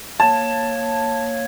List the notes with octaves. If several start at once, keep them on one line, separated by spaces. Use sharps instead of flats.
A#3 C#5 A5